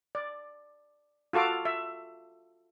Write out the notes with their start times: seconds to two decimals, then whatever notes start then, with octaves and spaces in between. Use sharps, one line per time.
0.15 D5
1.33 F4 F#4 A4 F5 D6
1.65 E5